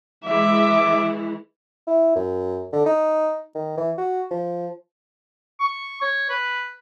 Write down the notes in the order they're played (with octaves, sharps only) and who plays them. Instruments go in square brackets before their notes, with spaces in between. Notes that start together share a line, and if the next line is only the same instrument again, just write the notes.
[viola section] E3 G#3 E4 [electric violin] E5 [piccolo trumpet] D6
[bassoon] E4
F#2
D3
D#4
D#3
E3
F#4
F3
[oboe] C#6
C#5
B4